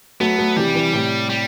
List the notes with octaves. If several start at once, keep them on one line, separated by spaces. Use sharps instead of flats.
F#3 A3 B3
F#3 A3
C3 E3 G3
C3 E3
A2 C3
G3